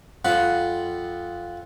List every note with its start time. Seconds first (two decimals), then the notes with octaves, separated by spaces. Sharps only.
0.25 F2 F4 F#5 B5